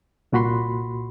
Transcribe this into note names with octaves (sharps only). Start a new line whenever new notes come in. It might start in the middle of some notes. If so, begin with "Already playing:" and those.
C2 A#2 F#4 B5 C6